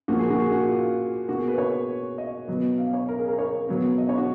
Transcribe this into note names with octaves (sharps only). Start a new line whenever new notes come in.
A#2 F3 A#3 F#4
G#4
F#4
G#4
F#4
F4
B2 A#3 F#4
G#4
B4
C#5
D#5
B2 F#3 B3
F5
C#5
A#4
G#4
A#4
C#5
B2 F#3 B3
D#5
C#5
F#4